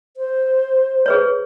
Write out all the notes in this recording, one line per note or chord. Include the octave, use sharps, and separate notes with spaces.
C5
G#4 B4 C#5